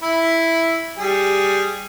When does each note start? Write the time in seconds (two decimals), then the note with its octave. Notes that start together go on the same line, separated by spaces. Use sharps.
0.03 E4
0.97 G3 G#4